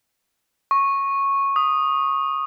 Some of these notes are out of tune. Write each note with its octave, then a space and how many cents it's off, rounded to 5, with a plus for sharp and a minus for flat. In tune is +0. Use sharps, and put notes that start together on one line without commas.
C#6 -10
D#6 -5